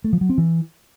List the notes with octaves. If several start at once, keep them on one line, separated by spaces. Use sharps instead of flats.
A3
F3
F#3
C4
E3